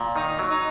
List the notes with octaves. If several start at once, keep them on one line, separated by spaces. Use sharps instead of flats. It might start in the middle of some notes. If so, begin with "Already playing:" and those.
Already playing: A#2
D#3 D#4
F#3
D#4